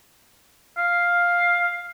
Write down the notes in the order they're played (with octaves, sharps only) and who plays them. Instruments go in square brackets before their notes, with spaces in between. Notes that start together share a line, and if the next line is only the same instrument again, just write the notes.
[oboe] F5